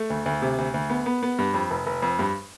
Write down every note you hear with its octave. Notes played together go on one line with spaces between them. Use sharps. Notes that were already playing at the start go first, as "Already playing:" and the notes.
Already playing: A3
D2
D2
C3
D2
D2
B3
B3
B3
G2
F2
F1
F1
F2
G2